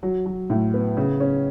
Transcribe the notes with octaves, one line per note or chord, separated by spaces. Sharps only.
F#3
F#3
A2
B3
C#3
C#4